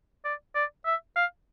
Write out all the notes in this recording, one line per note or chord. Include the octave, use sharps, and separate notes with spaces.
D5
D5
E5
F5